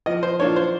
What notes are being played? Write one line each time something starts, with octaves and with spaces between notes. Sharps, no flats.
F3 D#5
C5
A#3 D4 F4 C#5
C5